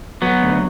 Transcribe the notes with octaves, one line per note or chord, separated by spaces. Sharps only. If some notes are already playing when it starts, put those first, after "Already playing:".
F#3 B3
D2